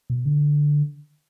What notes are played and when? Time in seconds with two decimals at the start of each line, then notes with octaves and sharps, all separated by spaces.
0.10 B2
0.25 D3